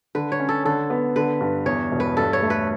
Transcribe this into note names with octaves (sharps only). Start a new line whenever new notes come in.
D3 B4
C#5
C#4
A4
D3 A4
B3
D3 B4
G2
E2 C#5
E1
B4
G2 A4
C#5
A3
B4